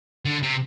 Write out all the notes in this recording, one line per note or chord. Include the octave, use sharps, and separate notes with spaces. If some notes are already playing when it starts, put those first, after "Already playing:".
D3
C3